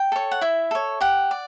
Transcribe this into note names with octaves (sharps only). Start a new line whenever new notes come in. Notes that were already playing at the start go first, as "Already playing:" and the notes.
Already playing: G5
A4 C#5
F#5
E4 E5
A4 C#5
G4 F#5
D5